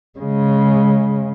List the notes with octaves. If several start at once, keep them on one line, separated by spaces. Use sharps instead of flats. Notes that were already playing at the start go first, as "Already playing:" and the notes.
C#3 G#3